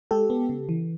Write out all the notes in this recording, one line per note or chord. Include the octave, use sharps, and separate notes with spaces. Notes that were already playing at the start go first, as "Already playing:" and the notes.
G#3 G4 A4
B3
C#3
E3